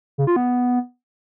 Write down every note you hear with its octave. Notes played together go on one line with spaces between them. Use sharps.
C#3
F4
B3